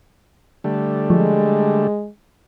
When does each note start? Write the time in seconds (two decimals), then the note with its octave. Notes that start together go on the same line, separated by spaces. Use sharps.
0.64 D3 G3 A3
1.10 F3 G#3